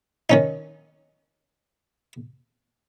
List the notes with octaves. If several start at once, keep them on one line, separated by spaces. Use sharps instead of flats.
D#3 C#4 D#4